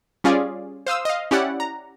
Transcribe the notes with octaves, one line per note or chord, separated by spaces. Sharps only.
G3 C#4 F4 G#4 D5 F5
C5 F5 D#6 E6
D#5 F5
C#4 E4 G4 D5 F#5
A#5